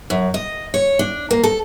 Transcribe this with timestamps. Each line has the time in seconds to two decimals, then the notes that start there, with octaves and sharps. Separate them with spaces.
0.10 F#2
0.34 D#5
0.74 C#5
0.99 D4
1.31 A#3
1.43 A4